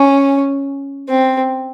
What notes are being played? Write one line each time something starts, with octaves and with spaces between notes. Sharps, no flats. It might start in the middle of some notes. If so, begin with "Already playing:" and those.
Already playing: C#4
C4